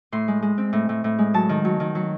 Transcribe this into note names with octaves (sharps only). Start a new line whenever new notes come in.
A2 C6
G#3
G#3
C4
A2
A2
A2
G#3
F#3 A5
D#3
F#3
D#3
F#3